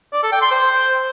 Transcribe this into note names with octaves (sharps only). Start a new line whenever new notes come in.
D5
A4
G5
C6
C5